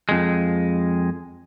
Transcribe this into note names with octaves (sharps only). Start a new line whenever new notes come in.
F2 G#3